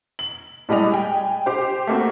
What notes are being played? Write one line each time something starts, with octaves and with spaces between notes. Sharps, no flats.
F#7
A2 G3 G#3 D5 D#5 F7
G5 G#5
G4 C5
A3 A#3 C4 F#4